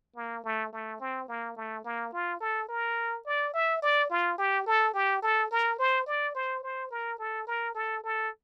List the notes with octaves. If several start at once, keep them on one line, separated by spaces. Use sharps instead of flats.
A#3
A3
A3
C4
A#3
A3
A#3
F4
A4
A#4
D5
E5
D5
F4
G4
A4
G4
A4
A#4
C5
D5
C5
C5
A#4
A4
A#4
A4
A4